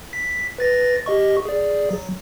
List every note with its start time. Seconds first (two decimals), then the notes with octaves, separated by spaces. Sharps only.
0.13 B6
0.58 B4 A6 A#6
1.06 G4 D#5 C#6
1.45 G#4 D5
1.91 F#3